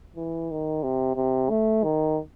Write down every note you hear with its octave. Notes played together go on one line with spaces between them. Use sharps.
E3
D#3
C3
C3
A3
D#3